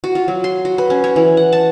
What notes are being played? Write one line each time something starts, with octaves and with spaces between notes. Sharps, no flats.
F#4
F4
F#3
C6
F#4
B4
C#4
C#5
E3
F#5
A5